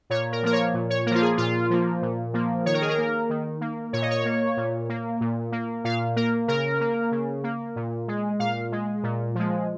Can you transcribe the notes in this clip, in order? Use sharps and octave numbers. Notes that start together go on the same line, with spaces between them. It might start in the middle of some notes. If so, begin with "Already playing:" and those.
A#2 C#5
A#4
F3 A#3 A#4
C#5
A#2
C#5
F3 A#3 F4 A#4
G#4
A#2 F4
F3 A#3
A#2
F3 A#3
D#3 C#5
A#4
G#4
A#4
A#3
D#3
A#3
A#2 C#5
D#5
C#5
A#3
A#2
A#3
A#2
A#3
A#2 F5
A#3 A#4
C#3 A#4
A#3
C#3
A#3
A#2
G#3
A#2 F5
G#3
A#2
F3 G#3